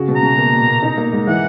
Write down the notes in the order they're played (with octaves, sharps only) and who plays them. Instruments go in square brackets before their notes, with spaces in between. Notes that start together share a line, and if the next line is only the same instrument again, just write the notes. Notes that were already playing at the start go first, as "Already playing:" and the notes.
Already playing: [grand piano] C#3 F#4
B2
[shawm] A#5
[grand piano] B2
A#3
A#2
A#2
D#4
A#3
G#2
[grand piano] E3 [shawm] F#5